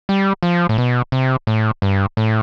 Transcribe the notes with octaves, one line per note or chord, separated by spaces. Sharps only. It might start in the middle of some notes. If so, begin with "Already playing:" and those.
G3
F3
A2
B2
C3
A2
G2
A2